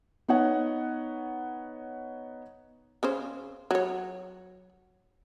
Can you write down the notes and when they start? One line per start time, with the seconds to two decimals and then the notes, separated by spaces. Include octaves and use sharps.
0.28 B3 D#4 C#5 F#5
3.03 C#3 C#4 C5
3.71 F#3 C#5